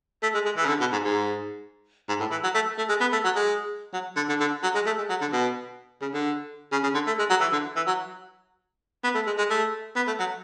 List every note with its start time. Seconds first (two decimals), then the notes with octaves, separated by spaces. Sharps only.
0.22 A3
0.34 G#3
0.45 G#3
0.57 E3
0.65 C#3
0.68 D3
0.80 B2
0.92 G#2
1.04 G#2
2.08 G#2
2.20 A2
2.31 E3
2.43 F#3
2.54 A3
2.78 A3
2.89 G#3
3.00 B3
3.12 A3
3.24 F#3
3.36 G#3
3.93 F#3
4.16 D3
4.29 D3
4.40 D3
4.63 F#3
4.74 G#3
4.86 A3
4.98 G#3
5.09 F#3
5.21 D3
5.32 B2
6.01 C#3
6.14 D3
6.72 C#3
6.83 C#3
6.94 D3
7.07 A3
7.18 G#3
7.29 F#3
7.40 E3
7.52 D3
7.76 E3
7.87 F#3
9.04 B3
9.15 A3
9.26 G#3
9.38 G#3
9.50 A3
9.96 B3
10.07 A3
10.19 F#3